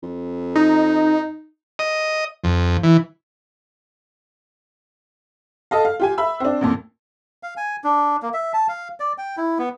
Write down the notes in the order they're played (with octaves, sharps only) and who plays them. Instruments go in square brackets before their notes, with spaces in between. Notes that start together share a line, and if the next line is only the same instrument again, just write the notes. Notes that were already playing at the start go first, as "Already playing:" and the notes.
[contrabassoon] F2
[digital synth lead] D#4
[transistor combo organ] D#5
F2
E3
[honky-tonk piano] A4 D#5 F5
F5
F4 G4 G#5
E5 B5 E6
C4 D4
A1 F2 A#2
[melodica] F5
G#5
D4
A#3
E5
A5
F5
D5
G5
E4
B3